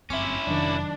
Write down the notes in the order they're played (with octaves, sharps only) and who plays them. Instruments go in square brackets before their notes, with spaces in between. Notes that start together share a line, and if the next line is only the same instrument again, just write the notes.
[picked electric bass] G1 F#2 C4 [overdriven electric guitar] C#4 E4 [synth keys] E5 C6 D6
[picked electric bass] F1 [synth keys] D#3 F#3 [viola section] D4